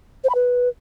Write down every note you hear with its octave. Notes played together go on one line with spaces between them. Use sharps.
C5
B5
B4